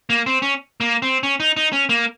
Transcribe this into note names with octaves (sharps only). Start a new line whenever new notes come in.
A#3
C4
C#4
A#3
C4
C#4
D#4
D#4
C#4
A#3